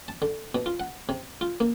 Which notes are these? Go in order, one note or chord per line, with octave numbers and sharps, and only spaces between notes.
A5
D3
B2
F4
F#5
C3
F4
A#3